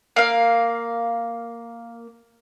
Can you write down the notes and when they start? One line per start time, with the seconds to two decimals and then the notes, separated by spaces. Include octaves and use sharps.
0.16 A#3 F5